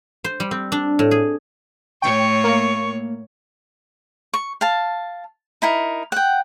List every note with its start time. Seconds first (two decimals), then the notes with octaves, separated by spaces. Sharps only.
0.24 C5
0.40 G3
0.51 C4
0.72 D4
0.99 A2
1.11 G#4
2.02 A2 C#5 G5 C#6
2.44 A#3
4.34 C#6
4.61 F5 A5
5.62 D#4 E4 A#4
6.12 F#5 G5